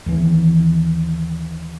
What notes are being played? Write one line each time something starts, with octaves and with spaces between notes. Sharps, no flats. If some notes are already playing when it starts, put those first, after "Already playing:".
D#2 E3